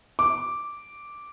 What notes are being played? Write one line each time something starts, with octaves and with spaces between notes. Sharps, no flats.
D6